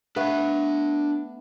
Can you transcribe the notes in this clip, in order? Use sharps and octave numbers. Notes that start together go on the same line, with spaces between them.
A3 B3 D4 B4 F5